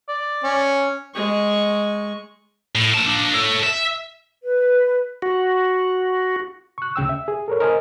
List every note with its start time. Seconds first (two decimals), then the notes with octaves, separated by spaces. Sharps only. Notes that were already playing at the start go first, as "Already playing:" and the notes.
0.09 D5
0.44 C#4
1.15 G#3 C#6
2.75 A2
2.94 A#3 A5
3.06 A#3 D4
3.34 A4 C#5
3.63 E5
4.43 B4
5.22 F#4
6.78 C#6 F#6
6.96 D2 C#3 G5 E6
7.09 E5
7.28 G#4
7.48 A4 A#4 C#5
7.60 A#4 C5 D#5 G#5 A5